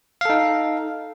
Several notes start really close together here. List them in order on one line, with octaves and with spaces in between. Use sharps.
F5 A4 D#4